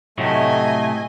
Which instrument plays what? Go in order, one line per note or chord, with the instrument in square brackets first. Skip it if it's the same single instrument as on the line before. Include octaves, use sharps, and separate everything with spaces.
[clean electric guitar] A2 C3 F#3 [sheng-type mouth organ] A3 [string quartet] D#5 G#5